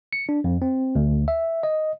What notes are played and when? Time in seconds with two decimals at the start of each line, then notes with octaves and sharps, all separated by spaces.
0.13 C#7
0.29 D4
0.44 F2
0.62 C4
0.95 D2
1.28 E5
1.63 D#5